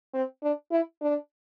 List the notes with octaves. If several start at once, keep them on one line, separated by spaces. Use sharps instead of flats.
C4
D4
E4
D4